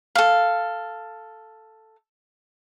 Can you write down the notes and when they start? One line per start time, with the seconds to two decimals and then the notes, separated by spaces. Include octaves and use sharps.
0.15 A4 F5